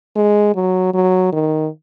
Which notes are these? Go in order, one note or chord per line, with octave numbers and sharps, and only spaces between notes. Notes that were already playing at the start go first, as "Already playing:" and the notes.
G#3
F#3
F#3
D#3